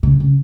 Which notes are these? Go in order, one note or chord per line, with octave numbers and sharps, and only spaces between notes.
C#3
C#3